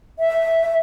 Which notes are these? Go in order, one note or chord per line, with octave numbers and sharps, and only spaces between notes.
E5